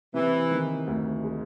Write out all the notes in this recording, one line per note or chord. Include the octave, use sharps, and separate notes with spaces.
C3 E3
D#3
D2
G#3